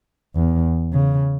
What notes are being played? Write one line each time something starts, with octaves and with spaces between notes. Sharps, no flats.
E2
C#3